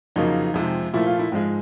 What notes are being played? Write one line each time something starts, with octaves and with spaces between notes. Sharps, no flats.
F2 C#3 F#3 A#3 D#4
F2 C3 F3 G#3
A#2 F3 A3 E4
F4
E4
G#2 F3 G#3